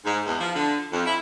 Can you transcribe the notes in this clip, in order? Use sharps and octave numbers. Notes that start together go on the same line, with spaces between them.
G#2
E2
F3
D3
F2
E4